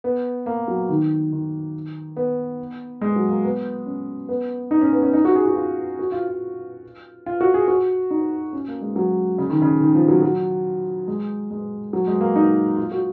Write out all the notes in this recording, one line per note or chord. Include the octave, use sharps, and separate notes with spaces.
B3
A#3
F#3
D#3
D#3
B3
G#3
F#3
A#3
B3
C#4
B3
D#4
C#4
B3
C#4
D#4
F#4
G#4
F#4
F4
F#4
F4
F4
F4
F#4
G#4
F#4
D#4
C#4
A#3
G#3
F#3
C#3
D#3
C#3
D#3
F3
F#3
F#3
G#3
G#3
F#3
G#3
A#3
D#4
F4
F#4